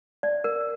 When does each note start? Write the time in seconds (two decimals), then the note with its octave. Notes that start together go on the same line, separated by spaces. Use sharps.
0.23 D5
0.44 A#4